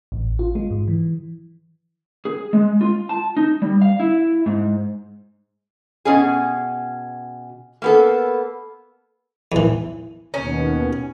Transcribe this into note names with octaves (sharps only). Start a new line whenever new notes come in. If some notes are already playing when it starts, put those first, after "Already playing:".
A1
F4
G#3
G#2
E3
G#4
G#3
F4
A5
D#4
G3
F5
E4
G#2
B2 C#4 G#4
A#3 B3 A4
E2 E3
D#2 B2 C#4